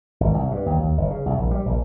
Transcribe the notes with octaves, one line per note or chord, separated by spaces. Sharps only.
G#1
C2
G2
D#2
D#2
G1
C#3
C2
A#1
G3
A#1